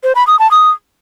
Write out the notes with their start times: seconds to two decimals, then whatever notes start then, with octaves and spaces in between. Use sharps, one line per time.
0.03 C5
0.15 B5
0.27 D#6
0.39 A5
0.51 D#6